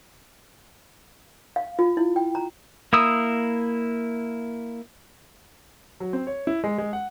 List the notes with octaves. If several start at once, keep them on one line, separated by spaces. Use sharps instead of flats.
F5
F4
E4
G5
A#5
A#3 E4 D#6 E6
F#3
C4
C#5
E4
G#3
G#3
F#5